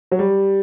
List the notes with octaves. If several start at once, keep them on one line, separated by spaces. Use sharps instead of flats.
F#3
G3